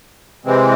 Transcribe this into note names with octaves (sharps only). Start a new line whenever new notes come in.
C3 E3 G#3 C4